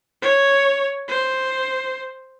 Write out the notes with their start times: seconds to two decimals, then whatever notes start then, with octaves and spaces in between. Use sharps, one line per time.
0.22 C#5
1.08 C5